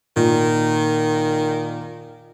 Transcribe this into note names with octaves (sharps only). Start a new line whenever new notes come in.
A#2 D#3